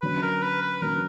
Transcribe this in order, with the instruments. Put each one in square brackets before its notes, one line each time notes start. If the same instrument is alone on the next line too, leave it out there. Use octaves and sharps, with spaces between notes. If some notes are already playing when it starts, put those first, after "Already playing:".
[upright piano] D3 F#3 C#4 [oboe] B4
[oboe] A#4
B4
B4
[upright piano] D3 F#3 C#4 [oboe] A#4